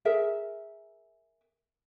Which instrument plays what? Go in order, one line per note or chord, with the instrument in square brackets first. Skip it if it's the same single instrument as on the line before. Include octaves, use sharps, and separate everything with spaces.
[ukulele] G#4 A#4 E5